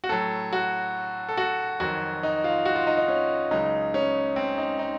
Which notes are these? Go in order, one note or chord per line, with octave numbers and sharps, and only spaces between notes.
F#4
A2 F#3 A4
F#4
A4
F#4
F2 D#3 F#3 F#4
D#4
F4
F#4
F4
D#4
D#4
C#4
C#2 C#3 F#3 D#4
C#4
C4
D#4
D#4